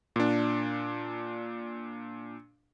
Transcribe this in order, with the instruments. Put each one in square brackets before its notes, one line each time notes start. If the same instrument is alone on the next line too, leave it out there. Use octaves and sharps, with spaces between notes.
[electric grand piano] A#2 D4